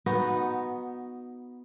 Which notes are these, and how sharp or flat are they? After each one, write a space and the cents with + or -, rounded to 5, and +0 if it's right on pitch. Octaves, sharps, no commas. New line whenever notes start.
B3 +0 D#4 +0 F#4 -15